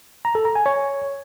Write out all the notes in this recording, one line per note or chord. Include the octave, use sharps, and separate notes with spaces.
A#5
A4
A#5
G#5
C#5